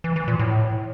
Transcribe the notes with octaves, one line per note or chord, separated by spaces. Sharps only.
E3
E3
A#2
A2